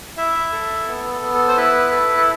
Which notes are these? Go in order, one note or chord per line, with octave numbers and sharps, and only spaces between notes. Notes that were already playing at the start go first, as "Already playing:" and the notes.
E4 E5
A4
B3
A4
B3
A4
C5
E4 B4
A4
A4